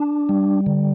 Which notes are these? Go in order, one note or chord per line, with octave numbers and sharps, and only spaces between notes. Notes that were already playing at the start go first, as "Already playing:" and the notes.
Already playing: D4
G3
D3